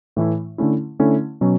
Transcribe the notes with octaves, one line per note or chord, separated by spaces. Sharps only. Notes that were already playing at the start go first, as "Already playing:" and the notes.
A2 E3 A3 E4
D3 A3 C#4 E4
D3 A3 C#4 E4
B2 F#3 C#4